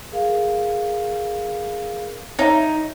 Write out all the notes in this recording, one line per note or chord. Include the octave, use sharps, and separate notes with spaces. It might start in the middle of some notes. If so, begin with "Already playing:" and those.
G#4 A#4 F5
D#4 C#5 E5 A#5